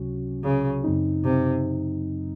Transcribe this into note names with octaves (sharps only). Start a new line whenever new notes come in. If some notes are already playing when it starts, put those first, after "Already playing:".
Already playing: C#2 C3 F#3 C#4 F#4
C#3
F#2 C#3 F#3 C4 D#4
C3